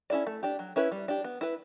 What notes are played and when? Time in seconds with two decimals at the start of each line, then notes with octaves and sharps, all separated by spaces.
0.10 C#4 E4 A4 D5
0.27 A3
0.43 D4 G4
0.59 F#3
0.76 C#4 E4 B4
0.92 G3
1.08 D4 G4
1.24 B3
1.41 E4 B4